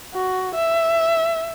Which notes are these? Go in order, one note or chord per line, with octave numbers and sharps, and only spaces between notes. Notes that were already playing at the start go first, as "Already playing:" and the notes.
F#4
E5